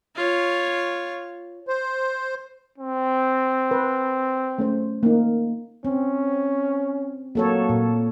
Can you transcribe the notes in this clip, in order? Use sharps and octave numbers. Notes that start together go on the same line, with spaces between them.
F4 C#5
C5
C4
B4
A3 C#4 C5
A#3 D#4
C4 C#4
F#3 A#3 A4 C#5
A#2